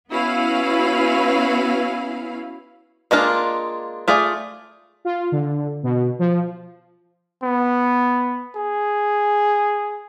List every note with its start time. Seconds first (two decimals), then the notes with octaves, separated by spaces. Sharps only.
0.10 B3 C#4 E4 F#4 B4 F5
3.11 G#3 A#3 D4 F4
4.08 A3 F4 G#4 D5
5.05 F4
5.32 D3
5.83 B2
6.19 F3
7.43 B3
8.56 G#4